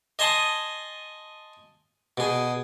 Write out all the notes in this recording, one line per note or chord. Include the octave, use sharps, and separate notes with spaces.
D#5 G#5 A5 C6 D#6
B2 G#4